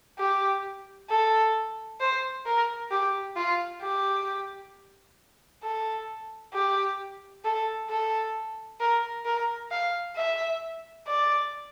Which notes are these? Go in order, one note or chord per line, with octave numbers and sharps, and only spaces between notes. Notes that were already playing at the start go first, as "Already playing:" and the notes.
G4
A4
C5
A#4
G4
F4
G4
A4
G4
A4
A4
A#4
A#4
F5
E5
D5